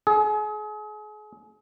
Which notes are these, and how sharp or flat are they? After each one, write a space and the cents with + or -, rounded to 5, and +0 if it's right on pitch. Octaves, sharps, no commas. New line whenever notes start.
G#4 +35